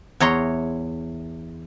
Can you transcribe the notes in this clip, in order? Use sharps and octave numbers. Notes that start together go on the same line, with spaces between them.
E2 C#5 A#5 C6